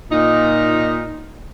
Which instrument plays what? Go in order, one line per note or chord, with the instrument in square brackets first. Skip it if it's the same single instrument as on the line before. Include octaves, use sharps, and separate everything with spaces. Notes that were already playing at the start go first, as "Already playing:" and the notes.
[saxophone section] A#2 D#4